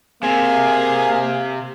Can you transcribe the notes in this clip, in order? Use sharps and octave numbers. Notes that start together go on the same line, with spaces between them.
C3 A#3 G#4 F5